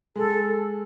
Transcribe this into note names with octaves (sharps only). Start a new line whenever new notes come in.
G#3 A4